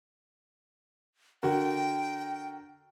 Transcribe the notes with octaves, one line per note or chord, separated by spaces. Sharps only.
D3 F#4 A#4 G5